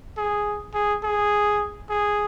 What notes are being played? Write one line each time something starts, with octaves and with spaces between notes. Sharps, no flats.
G#4
G#4
G#4
G#4